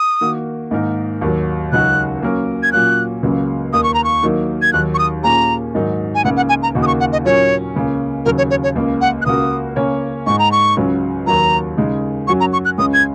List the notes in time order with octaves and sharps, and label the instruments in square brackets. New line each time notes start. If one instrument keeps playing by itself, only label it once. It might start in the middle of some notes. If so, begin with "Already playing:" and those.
Already playing: [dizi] D#6
[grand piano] D#3 A#3 F#4
G#2 D#3 A#3 D#4 A#4
D#2 D#3 F#3
[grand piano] C#2 C#3 F#3 D#4 F#4 [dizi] F#6
[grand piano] F#3 A#3 C#4 A#4
[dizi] G#6
[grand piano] A#2 F#3 A#3 C#4 [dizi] F#6
[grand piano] C#2 C#3 F#3 A#3
[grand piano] D#2 D#3 A#3 [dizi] D#6
[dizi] C#6
A#5
C#6
[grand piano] D#3 F#3 A#3 D#4
[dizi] G#6
[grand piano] D#2 D#3 F#3 [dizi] F#6
[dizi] C#6
D#6
[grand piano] A#2 A#3 C#4 G#4 [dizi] A#5
[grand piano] G#2 D#3 F#3 D#4
[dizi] G#5
[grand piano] C#2 C#3 A#3 [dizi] F#5
[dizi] F#5
G#5
A#5
[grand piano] D#2 C#3 A#3 D#4 F#4
[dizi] D#6
C#6
F#5
D#5
[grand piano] A#2 F#3 C#4 A#4 [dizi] C#5
[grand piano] C#2 C#3 A#3 C#4
[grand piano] D#2 C#3 F#3 [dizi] A#4
[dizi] C#5
C#5
C#5
[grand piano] C#2 C#3 A#3
[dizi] F#5
F#6
[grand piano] C#2 C#3 A#3 F#4 A#4 [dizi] D#6
[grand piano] C#3 A#3 C#4 A#4 C#5
[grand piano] G#2 G#3 D#4 [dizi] C#6
[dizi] A#5
C#6
[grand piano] C#2 C#3 F#3 C#4
[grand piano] D#2 D#3 F#3 [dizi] A#5
[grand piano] C#3 G#3 D#4
[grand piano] F#2 F#3 C#4 F#4 [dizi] C#6
[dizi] A#5
C#6
F#6
[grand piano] C#2 C#3 G#3 C#4 [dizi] D#6
[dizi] G#6